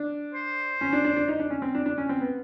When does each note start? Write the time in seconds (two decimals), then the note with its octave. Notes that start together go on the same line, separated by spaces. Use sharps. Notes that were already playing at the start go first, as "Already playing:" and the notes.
Already playing: D4
0.34 C5
0.81 C#4
0.93 D4
1.04 D4
1.16 D4
1.28 D#4
1.40 D4
1.50 C#4
1.62 C4
1.75 D4
1.86 D4
1.98 C#4
2.09 C4
2.21 B3